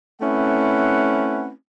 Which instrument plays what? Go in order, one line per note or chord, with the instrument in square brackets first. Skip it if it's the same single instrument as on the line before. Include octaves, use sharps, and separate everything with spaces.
[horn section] A3 C4 C#4 E4 B4 F#5